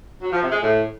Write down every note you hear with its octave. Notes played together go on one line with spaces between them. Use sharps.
F#3
F3
C3
G#3
A2